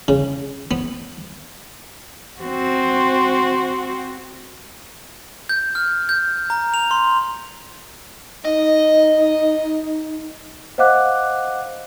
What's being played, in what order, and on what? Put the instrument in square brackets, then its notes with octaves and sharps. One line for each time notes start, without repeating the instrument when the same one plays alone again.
[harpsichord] C#3
B3
[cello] C4 F#4
[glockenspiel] G6
F6
G6
A#5
F7
C6
[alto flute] D#4 [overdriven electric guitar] D#5
[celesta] C5 D#5 F5 F#5 D6 F#6